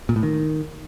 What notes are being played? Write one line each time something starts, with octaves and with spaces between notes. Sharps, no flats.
A#2
A2
D#3